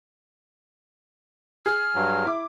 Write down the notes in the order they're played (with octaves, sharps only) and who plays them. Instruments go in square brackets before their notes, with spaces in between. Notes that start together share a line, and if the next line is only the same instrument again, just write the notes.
[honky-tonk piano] G#4 [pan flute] F6
[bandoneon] G2 F#3
[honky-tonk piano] E4 D6